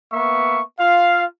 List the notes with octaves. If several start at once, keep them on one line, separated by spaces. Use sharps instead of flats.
A#3 B3 E5 C#6
F4 F5